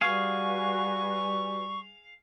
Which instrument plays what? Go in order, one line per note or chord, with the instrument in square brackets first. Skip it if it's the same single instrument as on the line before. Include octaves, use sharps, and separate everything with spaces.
[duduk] G3 [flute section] F#4 B4 G#5 [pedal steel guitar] G#4 F5 [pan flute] C#6